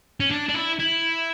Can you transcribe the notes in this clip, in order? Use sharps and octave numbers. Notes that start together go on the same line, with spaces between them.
C#4
D4
D4
E4
E4